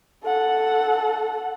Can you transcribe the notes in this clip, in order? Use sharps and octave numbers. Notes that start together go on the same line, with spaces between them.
A4 F#5